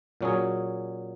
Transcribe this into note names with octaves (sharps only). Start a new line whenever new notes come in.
A#2 F#3 C#4 G#4